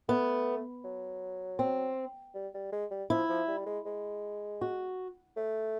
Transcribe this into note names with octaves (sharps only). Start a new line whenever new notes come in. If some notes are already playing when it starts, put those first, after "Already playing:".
A3 B3
F#3
C4
G3
G3
G#3
G3
F3 E4
F3
G3
G#3
G#3
F#4
A3